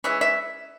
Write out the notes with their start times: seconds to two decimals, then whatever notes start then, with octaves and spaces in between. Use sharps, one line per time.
0.04 E3 G#3 C#4 E5
0.21 E5